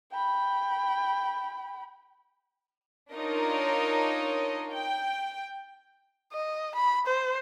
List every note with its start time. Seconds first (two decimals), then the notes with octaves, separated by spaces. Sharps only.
0.12 G5 B5
3.13 D4 D#4 F4 A#4 C#5 D#5
4.72 G5
6.33 D#5
6.75 B5
7.07 C5